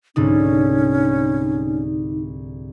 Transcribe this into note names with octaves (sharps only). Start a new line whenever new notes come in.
C2 G#2 D3 C#4 D#4